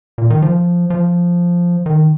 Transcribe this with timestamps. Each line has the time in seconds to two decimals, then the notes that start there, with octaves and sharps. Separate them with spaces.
0.18 A#2
0.30 D#3
0.42 F3
0.90 F3
1.86 D#3